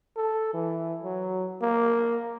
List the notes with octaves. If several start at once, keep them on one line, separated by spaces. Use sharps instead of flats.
A4
E3
F#3
A#3